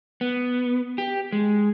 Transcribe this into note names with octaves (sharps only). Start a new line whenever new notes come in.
B3
G4
G#3